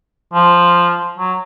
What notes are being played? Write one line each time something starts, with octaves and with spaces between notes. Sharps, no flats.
F3
F#3